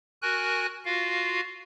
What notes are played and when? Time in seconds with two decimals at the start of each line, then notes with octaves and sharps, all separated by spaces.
0.22 F#4 A#4 G#5 F#6
0.85 F4 F#4 F5